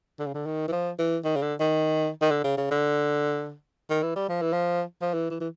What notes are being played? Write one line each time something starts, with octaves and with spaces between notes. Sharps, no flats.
D3
C#3
D3
D#3
E3
F3
E3
D#3
C#3
D3
D#3
D#3
D3
C#3
C#3
D3
D#3
E3
G3
F3
E3
F3
F3
E3
E3
E3